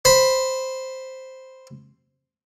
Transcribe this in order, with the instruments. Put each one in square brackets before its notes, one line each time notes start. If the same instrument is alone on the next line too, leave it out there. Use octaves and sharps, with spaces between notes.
[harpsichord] C5 B5